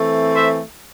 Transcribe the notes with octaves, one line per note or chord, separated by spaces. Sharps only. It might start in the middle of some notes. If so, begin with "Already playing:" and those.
Already playing: E3 A3 C4
C5 E5